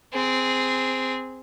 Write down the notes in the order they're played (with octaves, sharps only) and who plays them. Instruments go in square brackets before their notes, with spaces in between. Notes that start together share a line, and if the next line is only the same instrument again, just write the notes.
[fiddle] C4 G#4